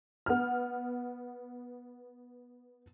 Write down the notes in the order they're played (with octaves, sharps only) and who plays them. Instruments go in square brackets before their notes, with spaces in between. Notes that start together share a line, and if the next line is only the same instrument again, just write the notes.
[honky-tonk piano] B3 F6